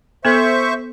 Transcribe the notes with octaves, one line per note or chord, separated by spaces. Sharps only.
B3 A4 C5 E5 C#6